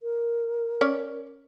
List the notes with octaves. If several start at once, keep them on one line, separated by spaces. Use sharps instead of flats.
A#4
C#4 C#5 D5